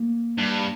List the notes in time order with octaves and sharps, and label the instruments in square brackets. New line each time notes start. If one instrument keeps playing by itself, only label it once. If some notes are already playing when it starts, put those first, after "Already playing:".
Already playing: [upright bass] A#3
[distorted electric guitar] G2